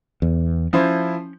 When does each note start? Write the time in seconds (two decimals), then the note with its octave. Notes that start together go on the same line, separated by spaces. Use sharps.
0.22 E2
0.73 F3 C#4 E4 C5